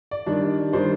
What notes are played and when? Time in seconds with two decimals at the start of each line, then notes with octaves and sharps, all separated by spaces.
0.11 D5
0.26 D#3 G3 D4
0.73 D#3 G3 D4 C5